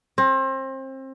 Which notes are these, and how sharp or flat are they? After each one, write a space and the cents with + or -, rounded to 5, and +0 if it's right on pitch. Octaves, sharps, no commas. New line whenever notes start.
C4 +30